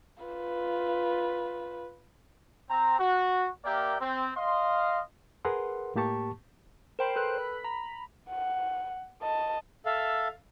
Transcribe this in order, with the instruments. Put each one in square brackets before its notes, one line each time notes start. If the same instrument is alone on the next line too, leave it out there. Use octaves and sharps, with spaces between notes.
[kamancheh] F4 B4
[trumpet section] C4 A#5
F#4
A#3 G4 A#4 D5 E5 G5
C4
D#5 F5 C6
[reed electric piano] G#4 A#4 B4 F#5 C6
A2 A#3 G4 A5 C#6
[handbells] A#4 G5 B5 [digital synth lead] C5
[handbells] A4 B4 F#6
[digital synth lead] B5
[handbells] A#5
[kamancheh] F#5
D#5 A5
[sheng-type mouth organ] A4 E5 F5